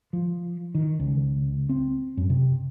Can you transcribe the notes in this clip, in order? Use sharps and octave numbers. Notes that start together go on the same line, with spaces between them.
F3
D#3
C#2
C4
F#2
C3